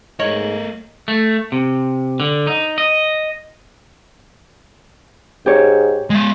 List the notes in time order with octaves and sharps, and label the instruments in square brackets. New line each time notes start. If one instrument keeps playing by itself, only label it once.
[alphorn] G#2 [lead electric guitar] A3 A#4 [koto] C#5 [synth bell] D#5 F#7
[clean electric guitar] A3
C3
D3
D#4
D#5
[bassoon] G#2 [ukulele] G4 C#5
[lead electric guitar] G#3 E5